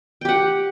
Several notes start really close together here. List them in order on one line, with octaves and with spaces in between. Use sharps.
G5 G4 F#5